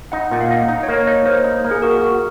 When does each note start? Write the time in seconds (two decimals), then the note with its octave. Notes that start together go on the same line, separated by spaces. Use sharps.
0.12 D#4 F#5
0.31 A#2 F#5
0.41 F5
0.51 D#4
0.68 D#4 D#5
0.83 C#5
0.88 A#3
0.97 C#5
1.07 D#4
1.26 A#3 C5
1.44 D#4
1.64 A#3
1.71 G#4
1.82 F#4 A#4
2.01 F#4